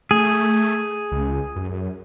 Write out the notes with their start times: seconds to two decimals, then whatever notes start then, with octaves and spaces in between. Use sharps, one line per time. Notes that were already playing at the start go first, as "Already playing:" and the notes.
0.11 A3 G#4
1.12 C#2
1.56 F#2